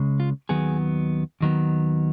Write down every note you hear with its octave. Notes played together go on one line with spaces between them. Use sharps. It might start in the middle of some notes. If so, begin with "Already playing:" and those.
Already playing: C#2 C#3 G#3
F4
D#2 D#3 F#3 B3 G#4
D#2 D#3 F#3 B3